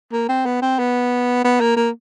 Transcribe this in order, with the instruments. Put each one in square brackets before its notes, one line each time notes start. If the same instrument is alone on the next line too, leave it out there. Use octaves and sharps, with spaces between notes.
[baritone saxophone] A#3
C4
B3
C4
B3
B3
A#3
A#3